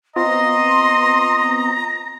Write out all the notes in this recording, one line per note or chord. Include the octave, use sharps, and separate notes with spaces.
B3 C4 F4 D#5 A#5 C6